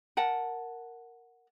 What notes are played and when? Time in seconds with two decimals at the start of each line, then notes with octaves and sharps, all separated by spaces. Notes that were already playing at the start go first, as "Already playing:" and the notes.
0.17 A#4 F#5 A5